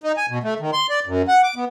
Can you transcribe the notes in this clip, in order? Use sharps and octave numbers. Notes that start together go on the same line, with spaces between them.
D#4
G#5
B2
A3
D#3
C6
D5
F#2
F#5
D6
B3